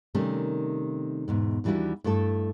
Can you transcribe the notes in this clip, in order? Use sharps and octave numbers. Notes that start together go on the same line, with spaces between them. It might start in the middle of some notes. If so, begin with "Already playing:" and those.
C3 D#3 G3 A3 C#4
E2 G#2 B2
D#2 E3 G3 D4 E4 F#4
G2 A3 E4 A4